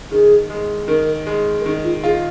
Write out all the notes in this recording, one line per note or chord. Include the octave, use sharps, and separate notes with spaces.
D#3 G#4
G#3
D#3 A#4
G#3
A#4
D#3 G#4
F4
F4 G#4